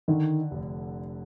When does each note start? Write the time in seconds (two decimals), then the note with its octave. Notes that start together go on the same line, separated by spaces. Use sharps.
0.08 D3 D#3
0.51 F1